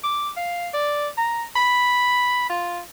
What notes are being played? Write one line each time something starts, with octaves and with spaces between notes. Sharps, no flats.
D6
F5
D5
A#5
B5
F4